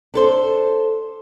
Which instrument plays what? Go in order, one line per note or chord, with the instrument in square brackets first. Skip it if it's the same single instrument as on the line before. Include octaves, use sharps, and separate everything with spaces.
[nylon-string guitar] D4 A4 C5